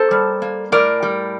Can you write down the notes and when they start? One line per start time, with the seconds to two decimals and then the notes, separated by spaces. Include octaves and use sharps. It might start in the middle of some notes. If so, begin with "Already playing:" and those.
Already playing: A#3 A4 C5
0.11 G3
0.42 A#3
0.72 A2 A#4 D5
1.03 G3